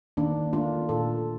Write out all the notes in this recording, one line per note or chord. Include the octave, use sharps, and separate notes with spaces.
D#3 A#3 D4
A3 D4 F4
A#2 F4 A4